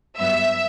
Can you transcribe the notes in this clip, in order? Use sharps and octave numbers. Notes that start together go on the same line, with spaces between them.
G2 F#3 B3 E5